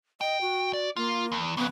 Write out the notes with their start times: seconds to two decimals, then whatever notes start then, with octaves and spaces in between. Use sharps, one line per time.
0.21 D#5 G5
0.41 F#4
0.73 D5
0.96 A#3 F4
1.32 E2
1.57 F2 C#3 B3